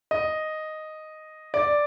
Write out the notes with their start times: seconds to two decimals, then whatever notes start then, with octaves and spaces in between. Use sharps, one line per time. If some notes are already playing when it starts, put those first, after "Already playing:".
0.11 D#5
1.54 D5